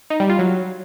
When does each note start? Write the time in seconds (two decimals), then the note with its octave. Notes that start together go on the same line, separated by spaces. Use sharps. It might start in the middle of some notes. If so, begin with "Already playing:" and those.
0.10 D#4
0.20 G3
0.29 F4
0.39 F#3